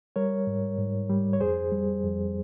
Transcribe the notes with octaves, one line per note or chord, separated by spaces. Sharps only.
G3 A#4 C#5
G#2
G#2
G3
C#5
F2 G#4 C5
G3
F2